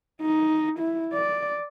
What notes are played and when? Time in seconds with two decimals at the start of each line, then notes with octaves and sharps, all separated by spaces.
0.21 D#4
0.79 E4
1.13 D5